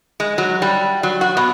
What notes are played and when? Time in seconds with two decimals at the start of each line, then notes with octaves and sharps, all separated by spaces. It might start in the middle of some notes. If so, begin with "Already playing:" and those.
0.20 G#3
0.38 F#3
0.62 G3
1.03 F#3
1.21 F#4
1.37 B2